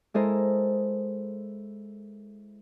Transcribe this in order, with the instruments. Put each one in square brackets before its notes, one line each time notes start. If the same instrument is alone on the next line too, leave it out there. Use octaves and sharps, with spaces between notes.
[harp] G#3 E4 A4 A#4 C5 D#5